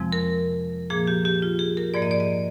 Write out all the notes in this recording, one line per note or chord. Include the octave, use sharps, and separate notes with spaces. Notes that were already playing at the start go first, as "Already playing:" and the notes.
Already playing: F2 C3 F3 G#3 C4
A#4
A#2 F3 A#3 G#4
G4
G4
F4
G#4
A#4
G#2 F3 A#3 D5
D#5
D5
D#5